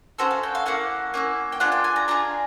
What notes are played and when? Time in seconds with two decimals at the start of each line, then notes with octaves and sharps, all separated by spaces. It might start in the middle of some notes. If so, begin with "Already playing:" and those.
0.18 C#4 F#4 A4 C5
0.31 F5
0.43 G5
0.55 F5
0.66 A#3 C#4 E4 F#5
1.14 A#3 C#4 E4
1.52 G5
1.60 D4 F4 G#4 F#5
1.72 G5
1.84 G#5
1.96 A#5
2.08 D4 F4 G#4 A#5